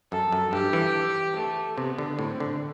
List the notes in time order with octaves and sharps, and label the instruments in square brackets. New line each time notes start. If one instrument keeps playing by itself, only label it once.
[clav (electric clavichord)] F#2 [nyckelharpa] A4
[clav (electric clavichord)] F#2
[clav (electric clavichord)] G2 [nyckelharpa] G4
[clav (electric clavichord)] E3
[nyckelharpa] A3
[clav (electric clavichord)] C3 [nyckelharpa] B3
[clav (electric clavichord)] D3
[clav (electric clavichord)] A2 [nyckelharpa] C4
[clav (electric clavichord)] D3